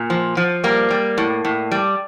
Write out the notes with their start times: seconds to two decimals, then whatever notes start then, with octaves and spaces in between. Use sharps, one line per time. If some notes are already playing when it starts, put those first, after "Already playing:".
Already playing: A#2
0.10 F3
0.37 F3
0.64 G3 A#3
0.91 G3
1.18 A2
1.45 A2
1.72 G3